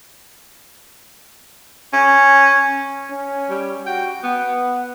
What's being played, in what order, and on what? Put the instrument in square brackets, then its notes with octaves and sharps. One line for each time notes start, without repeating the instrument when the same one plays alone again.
[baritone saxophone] C#4
[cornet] C#4
[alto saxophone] G3
[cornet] F#4 [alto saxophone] G5
[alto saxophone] B3 [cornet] F#5